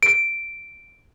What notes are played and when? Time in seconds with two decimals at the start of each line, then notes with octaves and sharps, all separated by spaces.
0.03 D7